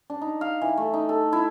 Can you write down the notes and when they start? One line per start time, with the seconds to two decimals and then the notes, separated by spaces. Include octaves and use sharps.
0.10 D4
0.21 D#4
0.41 F5
0.62 E3
0.77 A3
0.94 D#4
1.09 A4
1.33 E4